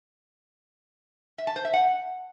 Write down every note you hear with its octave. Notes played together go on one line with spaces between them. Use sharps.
E5
A5
C5
E5
F#5